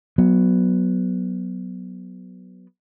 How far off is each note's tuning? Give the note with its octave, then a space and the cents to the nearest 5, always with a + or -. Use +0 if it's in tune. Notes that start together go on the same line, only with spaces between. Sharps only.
F#3 +0 B3 +0